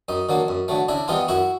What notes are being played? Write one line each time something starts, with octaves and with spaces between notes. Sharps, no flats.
F#2 D#4
D3 F#3 A#3
F#2
D3 F#3 A3
C#3 D4 E4
E3 G3 B3 D#4 F4
F#2 E4 F#4